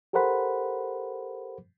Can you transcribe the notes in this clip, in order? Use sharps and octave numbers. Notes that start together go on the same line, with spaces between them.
G4 A4 A#4 C5 F#5 B5